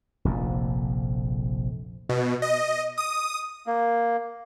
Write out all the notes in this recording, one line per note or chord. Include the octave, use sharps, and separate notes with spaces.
F1 A#1 F2
B2
D#5
D#6
A#3